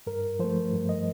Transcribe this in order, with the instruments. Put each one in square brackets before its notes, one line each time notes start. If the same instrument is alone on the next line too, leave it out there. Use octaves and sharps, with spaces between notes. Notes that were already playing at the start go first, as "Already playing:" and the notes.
[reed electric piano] G2 A#4
F3 A3 C5
G2
D#5